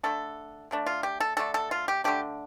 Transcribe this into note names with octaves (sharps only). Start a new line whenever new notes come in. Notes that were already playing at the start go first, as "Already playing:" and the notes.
D3 A3 D4 A4
D3 A3 D4
F4
G4
A4
D3 A3 D4 A4
A4
F4
G4
D3 A3 D4 G4